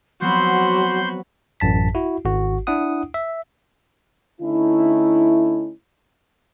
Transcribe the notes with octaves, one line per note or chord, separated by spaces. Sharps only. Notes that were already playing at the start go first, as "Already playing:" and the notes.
F3 F#3 B3 C4 F#4 B5 C6 G6
A1 F#2 A5 B6
E4 F#4
G#1 F#4
D4 E4 F#5 D#6
E5
D3 A3 C#4 D#4 E4